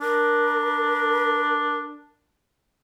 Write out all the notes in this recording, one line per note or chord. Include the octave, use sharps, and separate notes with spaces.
D4 A#4